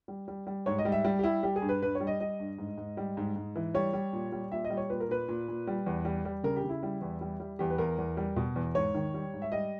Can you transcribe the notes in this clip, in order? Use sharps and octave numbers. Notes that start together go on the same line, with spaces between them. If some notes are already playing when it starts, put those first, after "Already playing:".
G3
G3
G3
G#2 C#5
D#5
G3
E5
G3
G4
G3 E4
G3 G4
G#4
G2
B4
G2 B4
C#5
G3
D#5
G3 D#5
G2
G#2
G#2
G3
G#2
G#2
E3
G3 C#5
G3
A#2
G3
A#2 E5
D#5
G3
C#5
A#2 B4
A#4
A#2 B4
A#2
A#2
G3
E2
G3
G3
C#3 A#4
G4
C#3
E4
G3
E2
G3
G3
E2 G4
B4
E2 A#4
E2
G3
B2
E2
G#2 C#5
D#3
G3
G#2
E5
G3 D#5